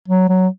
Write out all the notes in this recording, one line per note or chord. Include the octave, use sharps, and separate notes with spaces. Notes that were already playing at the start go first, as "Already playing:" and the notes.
F#3
F#3